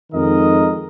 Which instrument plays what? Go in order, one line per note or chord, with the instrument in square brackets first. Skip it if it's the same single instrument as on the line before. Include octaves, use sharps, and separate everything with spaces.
[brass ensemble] F2 D#3 G#3 A#4 D#5